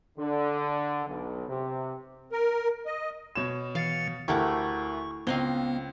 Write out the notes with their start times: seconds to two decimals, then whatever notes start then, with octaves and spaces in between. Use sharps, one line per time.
0.18 D3
1.06 B1
1.48 C3
2.32 A#4
2.86 D#5
3.35 B2 C#5 E7
3.75 E3 F5 A6 C#7
4.28 D2 A3 E4 G4 A#4 F#5 C#6
5.27 C#2 B3 C4 D#5 F5